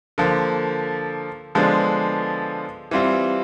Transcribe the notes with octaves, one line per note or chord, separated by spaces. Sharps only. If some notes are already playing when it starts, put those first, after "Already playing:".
D3 F3 A#3
D3 F3 G#3 B3 D4
E3 G3 C4 F4